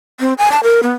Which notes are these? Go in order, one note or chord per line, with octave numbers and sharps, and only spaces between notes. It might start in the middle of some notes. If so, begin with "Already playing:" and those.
C4
G#5
A5
A#4
B3